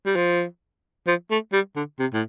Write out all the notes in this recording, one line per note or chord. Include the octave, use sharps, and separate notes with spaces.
G3
F3
F3
A3
G3
D3
C3
A2